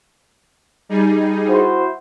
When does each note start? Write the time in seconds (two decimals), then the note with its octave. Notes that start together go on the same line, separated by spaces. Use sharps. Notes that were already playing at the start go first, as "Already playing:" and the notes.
0.89 G3 D#4 G#4
1.49 E4 F#4 C5